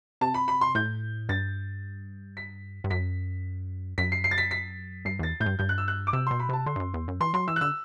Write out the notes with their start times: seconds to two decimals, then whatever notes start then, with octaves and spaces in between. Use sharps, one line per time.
0.21 C3 A5
0.34 B5
0.48 B5
0.61 C6
0.75 A2 G6
1.29 G2 A6
2.37 B6
2.84 G2
2.90 F#2 B6
3.98 F#2 B6
4.12 C7
4.24 C7
4.31 A6
4.38 B6
4.51 B6
5.05 G2 C7
5.19 E2 A6
5.40 A2 G6
5.46 G2
5.59 G2 G6
5.69 F#6
5.78 E6
5.88 F#6
6.07 D6
6.13 C3 E6
6.27 B2 C6
6.39 B5
6.49 C3 A5
6.66 D3 C6
6.76 G2
6.80 F#2
6.94 E2
7.08 F#2
7.21 E3 C6
7.34 F#3 C6
7.48 E3 E6
7.56 F#6
7.61 D3 E6